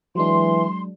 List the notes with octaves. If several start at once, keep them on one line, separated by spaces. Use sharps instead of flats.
E3 F#3 G#3 D4 C6